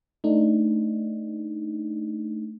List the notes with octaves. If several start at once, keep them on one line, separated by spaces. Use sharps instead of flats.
A3 D4 D#4